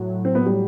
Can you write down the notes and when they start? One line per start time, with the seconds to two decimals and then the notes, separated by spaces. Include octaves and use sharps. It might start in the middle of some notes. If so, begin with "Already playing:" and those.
Already playing: A2 F#3
0.14 A2
0.25 C4
0.35 A2 B3
0.46 G3